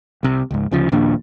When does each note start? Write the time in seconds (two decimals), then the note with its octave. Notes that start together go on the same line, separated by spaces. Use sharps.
0.23 C2 C3
0.51 C#2 G#2
0.71 D2 C#3 F3
0.92 A#1 D#2 A#2 D4